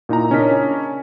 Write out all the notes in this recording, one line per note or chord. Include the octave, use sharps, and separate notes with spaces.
A#2 D#4 E4 A#5
C#3 C#4 D4 A#4 D#5 B6